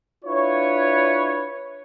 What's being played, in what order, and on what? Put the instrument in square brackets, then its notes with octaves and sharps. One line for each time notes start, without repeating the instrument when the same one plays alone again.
[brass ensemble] D4 E4 F4 B4 C#5